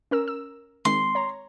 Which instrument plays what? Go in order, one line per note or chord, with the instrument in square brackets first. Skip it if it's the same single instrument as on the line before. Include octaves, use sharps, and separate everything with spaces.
[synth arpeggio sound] C#4 A#4 E6
E6
[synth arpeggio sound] D#3 G#3 C4 [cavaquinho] C6
[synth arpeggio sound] C#5 A#5